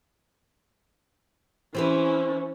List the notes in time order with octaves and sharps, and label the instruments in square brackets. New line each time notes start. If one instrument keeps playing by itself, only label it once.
[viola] E3 C#4 [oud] C4 G4 B4